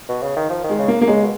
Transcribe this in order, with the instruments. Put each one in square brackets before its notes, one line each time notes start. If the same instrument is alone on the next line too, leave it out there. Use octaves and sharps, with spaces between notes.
[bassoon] B2
C#3
D#3
F3
D#3
[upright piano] G#3
[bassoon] C#3
[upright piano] A#3
A#3
[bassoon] C#3 [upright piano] G#3
[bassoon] B2